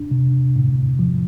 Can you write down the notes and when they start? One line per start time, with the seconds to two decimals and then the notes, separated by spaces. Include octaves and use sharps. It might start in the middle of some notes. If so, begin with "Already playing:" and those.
Already playing: D4
0.11 C3
0.56 A2
0.99 F3